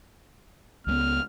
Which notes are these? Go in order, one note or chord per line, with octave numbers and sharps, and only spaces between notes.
C#2 F#3 B3 F6